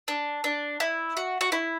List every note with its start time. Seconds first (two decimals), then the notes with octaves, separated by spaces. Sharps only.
0.08 D4
0.44 D4
0.80 E4
1.17 F#4
1.41 F#4
1.52 E4